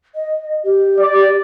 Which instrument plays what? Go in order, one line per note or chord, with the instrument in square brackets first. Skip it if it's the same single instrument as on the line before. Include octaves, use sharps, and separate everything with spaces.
[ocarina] D#5
G4
[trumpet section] D5